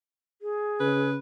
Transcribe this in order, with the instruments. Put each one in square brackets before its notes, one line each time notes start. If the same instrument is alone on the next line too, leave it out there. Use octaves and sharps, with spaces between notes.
[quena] G#4
[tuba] C#3 [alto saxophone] B4